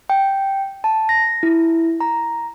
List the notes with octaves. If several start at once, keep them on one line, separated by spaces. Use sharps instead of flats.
G5
A5
A#6
E4
A#5